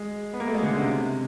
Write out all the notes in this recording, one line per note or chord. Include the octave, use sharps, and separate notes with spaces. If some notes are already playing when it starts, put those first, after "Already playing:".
Already playing: G#3
B3
A#3
A3
G#3
D3
C#3
C3